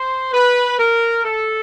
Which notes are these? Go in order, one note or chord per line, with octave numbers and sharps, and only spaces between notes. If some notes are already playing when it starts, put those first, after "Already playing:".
Already playing: C5
B4
A#4
A4